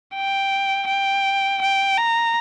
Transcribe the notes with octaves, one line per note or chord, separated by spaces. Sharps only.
G5
G5
G5
A#5